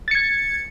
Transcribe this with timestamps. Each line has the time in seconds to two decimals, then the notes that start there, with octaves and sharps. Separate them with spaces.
0.08 A6
0.11 C#7
0.15 G#6